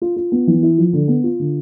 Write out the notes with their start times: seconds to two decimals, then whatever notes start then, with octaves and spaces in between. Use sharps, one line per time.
0.02 F4
0.16 F4
0.32 B3
0.47 E3
0.63 E4
0.78 F3
0.93 D3
1.08 B3
1.24 F4
1.39 D3